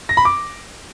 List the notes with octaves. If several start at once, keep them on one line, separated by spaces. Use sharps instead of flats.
A#6
B5
D6